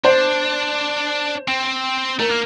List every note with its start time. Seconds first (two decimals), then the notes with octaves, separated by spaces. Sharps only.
0.05 D4 C5
1.48 C4
2.19 A3 A#4
2.29 A#3